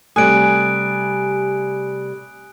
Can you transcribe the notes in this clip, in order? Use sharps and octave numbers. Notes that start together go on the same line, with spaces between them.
C3 G3 A3 G#5 D#6 F#6 D7